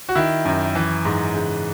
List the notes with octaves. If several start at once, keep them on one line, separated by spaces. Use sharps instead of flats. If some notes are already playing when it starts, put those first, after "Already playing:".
F#4
D#3 E4
F#2
E3
G#2
C#3